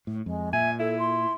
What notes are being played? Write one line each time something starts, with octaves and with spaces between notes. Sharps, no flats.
A2
F2 G#3
A#2 E5 G#5
E4 A4
C6